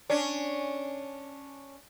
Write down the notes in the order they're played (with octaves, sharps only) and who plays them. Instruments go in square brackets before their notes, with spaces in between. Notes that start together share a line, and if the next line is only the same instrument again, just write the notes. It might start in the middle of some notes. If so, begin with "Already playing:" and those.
[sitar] C#4 D4